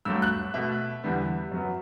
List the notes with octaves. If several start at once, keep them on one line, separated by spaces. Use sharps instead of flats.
G2 F#3 A3 E6
F#6
B2 A3 E5
E2 D3 G3 B3
F#2 F#3 B3